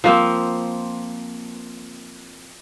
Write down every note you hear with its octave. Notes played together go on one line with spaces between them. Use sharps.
F3 A#3 C4